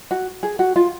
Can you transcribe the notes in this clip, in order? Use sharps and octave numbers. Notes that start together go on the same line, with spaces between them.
F#4
G#4
F#4
F4